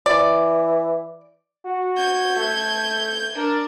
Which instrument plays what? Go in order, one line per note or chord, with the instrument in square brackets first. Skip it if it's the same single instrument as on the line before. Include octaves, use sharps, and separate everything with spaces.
[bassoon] E3 [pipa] D5
[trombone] F#4
[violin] G6 G#6
[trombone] A3
[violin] D4 [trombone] A#4